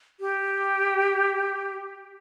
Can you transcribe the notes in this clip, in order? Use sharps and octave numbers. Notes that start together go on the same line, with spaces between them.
G4